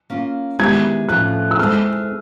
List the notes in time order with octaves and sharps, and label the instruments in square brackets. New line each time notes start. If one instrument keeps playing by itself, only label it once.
[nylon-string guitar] A#3 C#4 F4
[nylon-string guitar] D#3 G#3 B3 E4 G4 [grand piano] G#6
[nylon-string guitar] A2 F3 A3 C#4 F4 [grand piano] F#6
[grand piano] E6
[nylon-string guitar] G#3 C4 E4 A4 [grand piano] F6